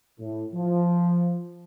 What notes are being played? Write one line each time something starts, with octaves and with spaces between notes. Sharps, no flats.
A2
F3